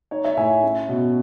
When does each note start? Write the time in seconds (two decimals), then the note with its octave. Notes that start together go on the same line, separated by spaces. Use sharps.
0.11 D#4 C#5
0.24 C#5 E5
0.37 A2 E5 G#5
0.63 C#4
0.89 B2